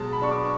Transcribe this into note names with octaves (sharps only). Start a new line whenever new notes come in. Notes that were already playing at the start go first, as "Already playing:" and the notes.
Already playing: B2 F#3 G#3 A5
B5
D4 C#6
D6